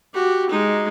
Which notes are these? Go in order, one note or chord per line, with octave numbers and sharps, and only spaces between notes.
F#4 G4
G#3 D#4